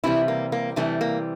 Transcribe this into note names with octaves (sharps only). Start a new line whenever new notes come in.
C3 E3 G3 E4
A#3
A#3
C3 E3 G3 A3
A#3